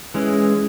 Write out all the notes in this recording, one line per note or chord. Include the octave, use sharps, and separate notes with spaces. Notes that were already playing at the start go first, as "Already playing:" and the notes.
E3 G#3 C#4